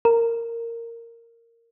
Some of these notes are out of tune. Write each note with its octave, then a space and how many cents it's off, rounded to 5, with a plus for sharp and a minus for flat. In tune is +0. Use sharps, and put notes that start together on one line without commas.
A#4 -10